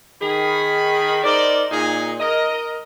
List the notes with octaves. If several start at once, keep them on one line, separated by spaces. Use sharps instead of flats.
D#3 G#4 B5
D#4 A#4 C5 D5
A#2 D#4 G#4
A#4 D#5